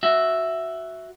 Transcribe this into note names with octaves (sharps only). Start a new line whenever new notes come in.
F#4 E5